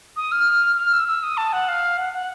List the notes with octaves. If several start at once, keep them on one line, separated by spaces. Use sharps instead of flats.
D#6
F6
F6
E6
E6
D#6
A5
F#5
F5
F#5
F#5